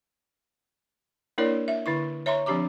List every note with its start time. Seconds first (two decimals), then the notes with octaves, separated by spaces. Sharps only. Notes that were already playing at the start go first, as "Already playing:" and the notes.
1.38 A#3 D4 E4 A#4 C#5 D5
1.68 E5
1.86 D3 E4 C#6
2.26 C#5 E5 A#5 C6 C#6
2.46 F3 C4 D4 G4 A#5 D6